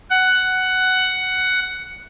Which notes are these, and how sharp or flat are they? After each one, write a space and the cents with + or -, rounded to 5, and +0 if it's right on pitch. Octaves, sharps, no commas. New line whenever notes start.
F#5 +10